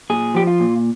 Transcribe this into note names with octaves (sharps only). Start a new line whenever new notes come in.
A#2 G#4
F3 G4
F4
A#2